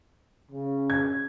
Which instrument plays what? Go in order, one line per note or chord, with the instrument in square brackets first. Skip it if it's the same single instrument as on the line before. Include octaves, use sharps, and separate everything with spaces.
[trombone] C#3
[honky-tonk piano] G#6